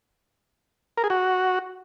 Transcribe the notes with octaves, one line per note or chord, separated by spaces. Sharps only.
A#4
G#4
F#4